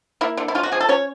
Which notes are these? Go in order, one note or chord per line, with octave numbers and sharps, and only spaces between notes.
A#3 E4
D3
E4
C#4 F4
F#4
F3 G#4
A4
C#4 C#5